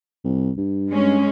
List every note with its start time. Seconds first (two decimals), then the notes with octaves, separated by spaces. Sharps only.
0.24 C2
0.57 G2
0.89 G#3 C#4